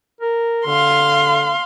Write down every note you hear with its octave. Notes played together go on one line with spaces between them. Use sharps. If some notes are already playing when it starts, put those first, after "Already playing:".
A#4
D3 F5 C6